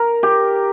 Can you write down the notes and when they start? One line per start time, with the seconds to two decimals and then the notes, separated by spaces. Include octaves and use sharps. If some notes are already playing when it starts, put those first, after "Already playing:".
Already playing: A#4
0.23 G4